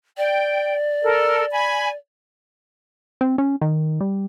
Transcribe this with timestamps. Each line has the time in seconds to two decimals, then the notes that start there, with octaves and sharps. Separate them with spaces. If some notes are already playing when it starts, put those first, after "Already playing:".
0.18 D5 G5
1.03 A4 A#4
1.52 G#5 B5
3.21 C4
3.38 C#4
3.61 D#3
4.01 G3